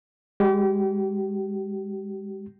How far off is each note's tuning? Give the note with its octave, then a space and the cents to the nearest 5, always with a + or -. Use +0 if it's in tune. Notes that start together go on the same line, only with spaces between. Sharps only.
G#3 -30 G4 -35